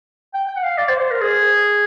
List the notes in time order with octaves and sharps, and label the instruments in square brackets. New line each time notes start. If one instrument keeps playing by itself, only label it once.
[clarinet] G5
G5
F#5
F5
D5
C5
C5
A#4
G#4